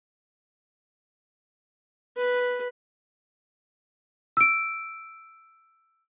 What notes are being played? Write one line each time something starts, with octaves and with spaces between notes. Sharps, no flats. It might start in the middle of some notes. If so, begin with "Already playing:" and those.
B4
E6 D7